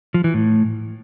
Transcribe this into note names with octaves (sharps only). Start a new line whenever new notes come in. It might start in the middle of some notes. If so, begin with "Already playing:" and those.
F3
E3
A2